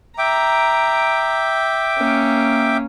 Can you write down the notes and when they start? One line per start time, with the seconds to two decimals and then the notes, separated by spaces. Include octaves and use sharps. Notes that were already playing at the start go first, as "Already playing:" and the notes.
0.18 E5 G5 A#5 D6
1.98 A#3 C#4